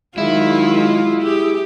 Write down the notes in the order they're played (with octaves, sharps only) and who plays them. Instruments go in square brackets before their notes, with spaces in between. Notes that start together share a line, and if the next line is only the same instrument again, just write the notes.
[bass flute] D#3 [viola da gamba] F#3 F4 [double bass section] G#3 [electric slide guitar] E4
[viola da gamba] G4 [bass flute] G#4